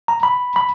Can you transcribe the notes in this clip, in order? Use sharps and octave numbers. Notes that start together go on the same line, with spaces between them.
A#5
B5
B5